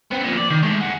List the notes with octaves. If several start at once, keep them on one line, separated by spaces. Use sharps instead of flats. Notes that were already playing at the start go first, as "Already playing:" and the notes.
B3 C4
F2 A#2
D5
D#3
G#3 A3
G#4 F#5